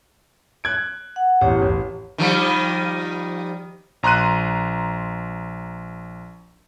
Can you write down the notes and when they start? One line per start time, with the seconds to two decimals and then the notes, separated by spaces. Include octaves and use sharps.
0.64 F#6 G#6 D7
1.16 F#5
1.41 A1 E2 G4 C#5
1.62 A1
2.18 D#3 F3 G3
4.03 A#1 A#5 C6 F#6 D#7